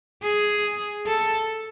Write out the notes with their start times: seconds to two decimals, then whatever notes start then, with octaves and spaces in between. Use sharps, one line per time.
0.23 G#4
1.07 A4